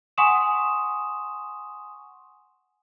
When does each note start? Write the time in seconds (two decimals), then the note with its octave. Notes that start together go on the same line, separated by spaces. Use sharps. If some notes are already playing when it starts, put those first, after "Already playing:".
0.18 F#5 G#5 C6 C#6 D#6 E7